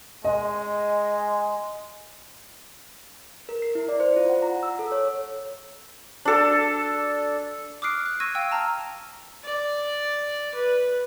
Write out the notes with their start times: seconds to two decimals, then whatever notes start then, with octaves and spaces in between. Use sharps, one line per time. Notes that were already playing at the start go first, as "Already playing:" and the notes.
0.25 G#3 D#5
3.49 A#4
3.62 C7
3.75 E4
3.89 D5
4.00 C5
4.16 F4
4.30 F#5
4.42 A#5
4.63 E6
4.79 A4
4.92 C#5
6.25 D4 A4
7.82 D6 D#6 F6 F#6 C7 D7
8.06 F#6
8.20 C#6 E6 G#6 A#6 D#7
8.35 F5 G5 E6
8.51 A5 A#5 F6
9.45 D5
10.55 B4